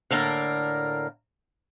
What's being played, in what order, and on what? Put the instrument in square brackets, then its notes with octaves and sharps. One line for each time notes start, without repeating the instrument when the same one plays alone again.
[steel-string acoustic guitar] A2 D3 A#3 A#4 D5